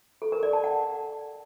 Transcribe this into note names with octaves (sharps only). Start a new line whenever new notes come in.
A4
A#4
D5
A5
F#5